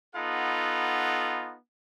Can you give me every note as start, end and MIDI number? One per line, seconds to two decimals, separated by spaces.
0.16 1.56 59
0.16 1.56 63
0.16 1.56 65
0.16 1.56 69
0.16 1.56 78
0.16 1.56 83